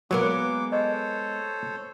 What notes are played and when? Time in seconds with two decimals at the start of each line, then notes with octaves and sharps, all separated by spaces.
0.11 F#3 G#3 A#3 B3 A#4 D6
0.72 A4 C5 C#5 D#5